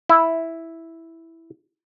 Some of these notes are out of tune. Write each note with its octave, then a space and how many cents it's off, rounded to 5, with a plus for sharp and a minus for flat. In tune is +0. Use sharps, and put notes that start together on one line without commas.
E4 -5